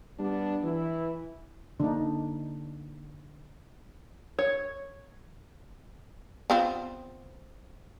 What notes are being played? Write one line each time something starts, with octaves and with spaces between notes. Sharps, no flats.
G3 B3 D4
E3 E4
D3 A#3 D4 D#4
C#5
B3 C4 F4